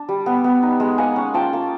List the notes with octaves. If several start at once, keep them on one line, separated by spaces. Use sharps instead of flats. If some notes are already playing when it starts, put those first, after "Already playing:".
Already playing: D4
G3
B3
B3
D#4
G#3
A#3 F#5 G#5
C#4
F4 G5 A5
A#3